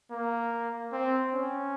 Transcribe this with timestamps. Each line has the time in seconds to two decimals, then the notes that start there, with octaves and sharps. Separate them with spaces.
0.11 A#3
0.92 C4
1.34 C#4